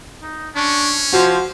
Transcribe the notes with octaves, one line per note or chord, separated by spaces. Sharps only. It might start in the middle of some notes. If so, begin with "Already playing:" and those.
D#4
C#4 D4 C#6
F3 F#4 C5